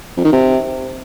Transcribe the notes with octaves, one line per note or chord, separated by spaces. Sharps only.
F2
D#3
C3